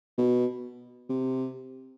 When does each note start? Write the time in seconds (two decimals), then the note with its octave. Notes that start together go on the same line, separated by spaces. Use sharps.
0.18 B2
1.09 C3